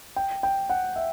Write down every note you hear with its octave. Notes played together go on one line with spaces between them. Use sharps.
G5
G5
F#5
E5